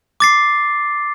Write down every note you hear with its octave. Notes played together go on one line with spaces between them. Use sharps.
D6 A6 C7